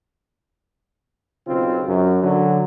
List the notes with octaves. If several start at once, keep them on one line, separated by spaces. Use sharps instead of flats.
B1 C#3 C4 F4
F#2
D3 F#3